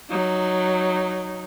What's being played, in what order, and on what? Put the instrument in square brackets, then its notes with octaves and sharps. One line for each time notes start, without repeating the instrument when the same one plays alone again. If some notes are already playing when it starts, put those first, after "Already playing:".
[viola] F#3 D#4